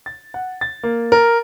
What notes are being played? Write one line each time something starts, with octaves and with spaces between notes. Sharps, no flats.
A6
F#5
A6
A#3
A#4